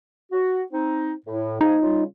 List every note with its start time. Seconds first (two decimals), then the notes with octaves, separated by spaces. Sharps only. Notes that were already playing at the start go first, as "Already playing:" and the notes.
0.32 F#4
0.72 C4 D#4
1.26 A2
1.61 F3 A#3 D#4 G#4
1.82 C#3 G3 F4